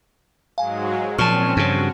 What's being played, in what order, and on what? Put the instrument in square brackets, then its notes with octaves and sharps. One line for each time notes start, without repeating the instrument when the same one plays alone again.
[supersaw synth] G#2 F#3 G#3 [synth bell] F5 G#5
[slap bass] A#2 [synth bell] F3 C#6 [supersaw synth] C4 C#4 [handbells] A5 F6
[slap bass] G2 C#3 [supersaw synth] F#4